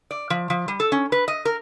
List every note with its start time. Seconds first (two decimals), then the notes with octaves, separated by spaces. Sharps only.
0.11 D5
0.30 F3
0.50 F3
0.68 G3
0.80 A4
0.92 C#4
1.12 B4
1.28 D#5
1.45 A#4